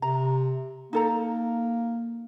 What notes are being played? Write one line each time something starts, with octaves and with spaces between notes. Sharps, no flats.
C3 A#5
A#3 D#4 A4 A#5